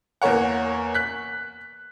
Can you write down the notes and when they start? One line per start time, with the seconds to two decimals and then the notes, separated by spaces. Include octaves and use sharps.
0.22 E2 A#3 A#4 C#5 F#5
0.95 F#6 B6